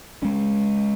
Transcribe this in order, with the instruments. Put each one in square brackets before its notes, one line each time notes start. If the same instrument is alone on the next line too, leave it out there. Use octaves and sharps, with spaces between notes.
[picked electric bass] G#3 C#4